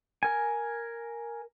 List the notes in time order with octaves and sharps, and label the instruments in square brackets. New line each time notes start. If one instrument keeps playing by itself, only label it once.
[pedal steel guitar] A#4 G#5